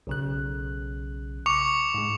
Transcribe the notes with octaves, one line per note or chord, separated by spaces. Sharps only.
B1 C#3 F#6
C#6 D6 C#7 F7
G#2 G#3